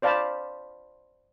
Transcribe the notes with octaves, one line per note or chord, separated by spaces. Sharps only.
C5 D5 F5 A5 B5